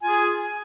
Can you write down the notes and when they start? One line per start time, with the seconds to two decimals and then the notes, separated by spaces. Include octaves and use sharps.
0.01 G#5
0.04 F4
0.07 G#4